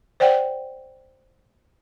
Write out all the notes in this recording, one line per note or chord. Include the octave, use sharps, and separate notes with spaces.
C5 D5 F#5 G5